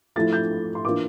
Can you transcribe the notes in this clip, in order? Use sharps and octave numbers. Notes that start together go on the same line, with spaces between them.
F3 A3 E4 A6
G6
C6
E3 A#3 D4 F4 D6